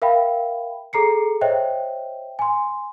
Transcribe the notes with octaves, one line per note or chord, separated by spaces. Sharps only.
A#4 E5 F5 G5 B5
G#4 A4 A#5 C7 C#7
C5 C#5 D#5 E5 G5
G#5 C6